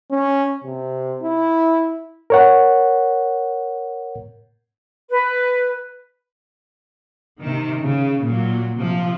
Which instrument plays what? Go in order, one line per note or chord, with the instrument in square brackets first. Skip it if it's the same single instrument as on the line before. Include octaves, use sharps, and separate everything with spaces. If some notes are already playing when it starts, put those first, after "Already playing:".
[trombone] C#4
C3
E4
[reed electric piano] A#4 C#5 F#5
[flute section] B4
[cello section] C3 D#3
C#3
A#2 F#3
C3 F3